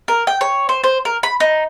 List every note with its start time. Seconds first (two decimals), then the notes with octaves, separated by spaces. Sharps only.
0.08 A#4
0.27 G5
0.41 C#5
0.69 C5
0.84 C5
1.05 A#4
1.23 B5
1.40 D#4